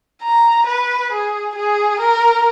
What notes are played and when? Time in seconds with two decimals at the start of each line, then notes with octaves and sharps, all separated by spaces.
0.24 A#5
0.67 B4
1.12 G#4
1.55 G#4
1.99 A#4